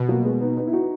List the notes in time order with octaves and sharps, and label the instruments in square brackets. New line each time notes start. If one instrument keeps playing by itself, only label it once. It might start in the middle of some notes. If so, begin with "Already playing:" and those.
Already playing: [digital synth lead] B2
[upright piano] F#3 A#3
G#3 B3
B3 D#4
B3 D#4
E4
D#4 F#4